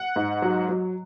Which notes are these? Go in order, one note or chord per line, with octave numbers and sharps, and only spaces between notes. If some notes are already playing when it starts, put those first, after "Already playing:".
Already playing: F#5
G#2
F#3
F#3